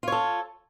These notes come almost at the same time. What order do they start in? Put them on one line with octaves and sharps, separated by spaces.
F4 C#5 A4